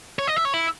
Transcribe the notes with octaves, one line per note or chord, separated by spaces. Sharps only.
C#5
D#5
E5
C#5
E4